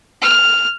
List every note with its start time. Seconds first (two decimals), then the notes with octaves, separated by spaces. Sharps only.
0.22 F6